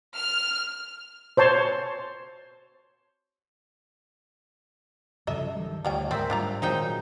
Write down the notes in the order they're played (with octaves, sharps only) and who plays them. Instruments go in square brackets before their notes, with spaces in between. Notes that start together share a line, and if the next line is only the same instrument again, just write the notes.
[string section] F6
[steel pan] C5 C#5 A5 C6
[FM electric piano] C2 A4 [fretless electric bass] G2 C#3 F3 [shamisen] D#5 E5
[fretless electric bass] D#3 G3
[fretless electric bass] D2 [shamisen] F3 G3 G5 [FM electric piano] C#5 G#5
[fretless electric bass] D2 G#2 G#3 [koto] C4 [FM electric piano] A#4 E5 [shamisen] D5
[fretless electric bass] G#2 G3 [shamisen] D4 F4 A#5
[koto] A#2 D#4 G5 [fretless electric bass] D#3 [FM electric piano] F#3 G#3 C4